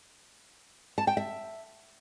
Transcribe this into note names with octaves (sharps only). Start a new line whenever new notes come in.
A5
G5
E5